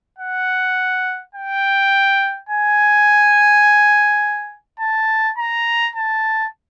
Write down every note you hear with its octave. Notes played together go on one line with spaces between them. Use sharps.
F#5
G5
G#5
A5
A#5
A5